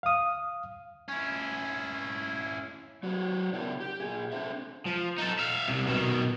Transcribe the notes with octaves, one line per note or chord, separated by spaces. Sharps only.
F5 D#6
C#4 E4
F#3 F#4 G4 C5 C#5
C#3 B3 D4 E4 A#4 G5
G4
A#2 G#4
C4 D4 A4 C5 E5
F3
D#4 A4
E5 F5
C2 C3
B2 D#3